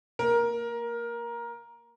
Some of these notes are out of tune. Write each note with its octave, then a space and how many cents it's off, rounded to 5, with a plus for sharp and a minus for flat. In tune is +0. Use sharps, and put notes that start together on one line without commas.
A#3 -20 A#4 +15